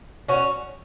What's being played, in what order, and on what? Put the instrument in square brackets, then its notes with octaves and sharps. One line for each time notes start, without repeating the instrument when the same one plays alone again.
[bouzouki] C#4 F#4